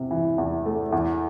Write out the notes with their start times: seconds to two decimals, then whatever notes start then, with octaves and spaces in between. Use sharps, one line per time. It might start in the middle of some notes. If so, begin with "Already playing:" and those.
Already playing: E2 C3
0.11 E3
0.38 E2
0.66 A3
0.92 E2